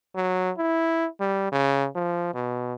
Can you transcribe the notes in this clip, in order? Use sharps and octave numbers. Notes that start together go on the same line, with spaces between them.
F#3
E4
G3
C#3
F3
B2